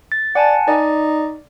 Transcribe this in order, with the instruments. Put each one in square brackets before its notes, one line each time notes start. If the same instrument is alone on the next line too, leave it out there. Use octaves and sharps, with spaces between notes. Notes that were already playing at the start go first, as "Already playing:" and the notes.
[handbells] A6
[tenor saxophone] D5 [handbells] F#5 G#5 A5
[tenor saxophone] D#4 [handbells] D5